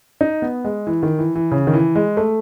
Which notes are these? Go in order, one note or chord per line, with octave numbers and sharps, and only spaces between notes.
D#4
B3
G#3
E3
D#3
E3
E3
C#3
D#3
E3
G#3
A3